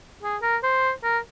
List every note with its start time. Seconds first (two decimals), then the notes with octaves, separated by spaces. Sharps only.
0.22 G#4
0.42 A#4
0.63 C5
1.04 A#4